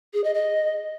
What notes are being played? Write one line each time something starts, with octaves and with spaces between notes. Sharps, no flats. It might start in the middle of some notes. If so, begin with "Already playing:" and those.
G#4
D#5
D#5